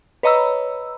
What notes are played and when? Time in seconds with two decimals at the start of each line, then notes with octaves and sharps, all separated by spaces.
0.23 B4 C#5 D#5 A#5 B5 E6